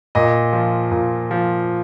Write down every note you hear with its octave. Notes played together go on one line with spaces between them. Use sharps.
A#2 D#5
F3
A#2
F3